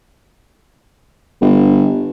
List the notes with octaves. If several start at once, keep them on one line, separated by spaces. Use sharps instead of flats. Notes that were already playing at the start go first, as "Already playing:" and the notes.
G1